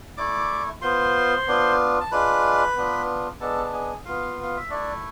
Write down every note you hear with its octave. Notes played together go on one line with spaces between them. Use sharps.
A3 E4 D5 D6
B3 F4 C5 C6
B3 D4 F4
A5
G#3 D4 F4 B4 B5
B3 D4 F4
G#3 B3 D4 A4 A5
A5
G#4 G#5
B3 F4 F5
F5
E5
A3 D4 E4 D5